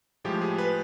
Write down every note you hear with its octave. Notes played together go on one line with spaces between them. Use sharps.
A2 F3 G#3 G4
G#4
B4